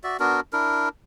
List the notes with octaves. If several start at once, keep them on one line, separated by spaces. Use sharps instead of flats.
F#4 D5 E5
B3 D4 F#4 A#4
D4 E4 A#4